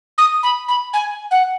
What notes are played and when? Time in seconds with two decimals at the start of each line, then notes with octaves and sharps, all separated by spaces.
0.18 D#6
0.43 B5
0.68 B5
0.93 G#5
1.31 F#5